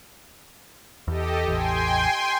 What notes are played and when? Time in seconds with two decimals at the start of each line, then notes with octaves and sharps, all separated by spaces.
1.08 E2 G4 A4 D#5
1.48 A1 E2 G5 G#5 C6